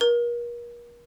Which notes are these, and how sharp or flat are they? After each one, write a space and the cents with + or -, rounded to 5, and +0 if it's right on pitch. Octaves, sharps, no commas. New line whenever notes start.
A#4 +35